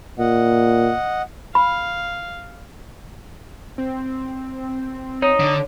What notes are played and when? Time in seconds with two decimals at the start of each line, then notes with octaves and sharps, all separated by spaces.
0.19 A#2 D#5 F#5
1.55 F5 B5
3.78 C4
5.22 D#4 C#5
5.40 D3